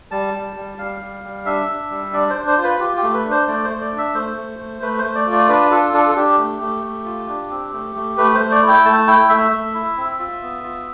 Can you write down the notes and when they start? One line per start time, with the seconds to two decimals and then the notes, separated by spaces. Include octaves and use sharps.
0.11 G3 A5
0.34 G3
0.56 G3
0.78 G3 F5
1.01 G3
1.24 G3
1.46 D4 E5
1.69 D4
1.91 G3
2.13 D4 D5
2.30 C5
2.35 D4
2.47 C5
2.58 F4
2.64 B4
2.80 F4 G4
2.97 G4
3.03 A3
3.14 B4
3.25 D4
3.31 C5
3.48 A3 D5
3.64 C5
3.70 A3
3.81 D5
3.92 D4
3.98 E5
4.14 A3 C5
4.37 A3
4.59 A3
4.82 A3 B4
4.98 C5
5.04 A3
5.15 D5
5.27 F4
5.32 D5
5.49 D4 B4
5.71 F4 A4
5.94 D4 A4
6.09 A4
6.16 D4 G4
6.38 A3
6.61 A3
6.84 A3
7.06 F4
7.29 D4
7.51 C4
7.73 A3
7.96 A3
8.18 A3 B4
8.35 C5
8.40 A3
8.51 D5
8.63 E4
8.68 G5
8.85 A3 A5
9.07 E4 G5
9.29 A3 E5
9.52 A3
9.74 E4
9.97 C4
10.19 F4
10.42 B3
10.64 F4